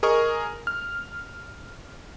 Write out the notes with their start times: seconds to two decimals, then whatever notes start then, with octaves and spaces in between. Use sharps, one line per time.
0.03 G#4 A#4 D#5 C#6
0.67 F6